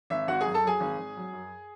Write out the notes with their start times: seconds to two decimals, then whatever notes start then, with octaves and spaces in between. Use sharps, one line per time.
0.10 G#1 E5
0.27 G#1 F#4 F#5
0.41 F#2 G#4 G#5
0.54 A4 A5
0.63 F#3 G#4 G#5
0.80 G#1
0.98 G#1
1.16 F#3
1.33 F#2